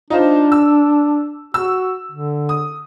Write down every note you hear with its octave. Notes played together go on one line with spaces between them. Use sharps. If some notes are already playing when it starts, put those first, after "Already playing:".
D4 D#4 F4 C5
E6
F#4 E6
D3
D#6